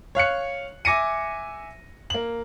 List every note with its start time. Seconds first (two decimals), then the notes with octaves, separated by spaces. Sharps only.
0.15 C#5 F5 F#6 C#7
0.85 E5 G#5 D6 A#6 C#7 D#7
2.10 A#3 F#7